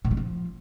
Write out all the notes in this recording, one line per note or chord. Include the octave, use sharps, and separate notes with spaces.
A#2
F#3
F3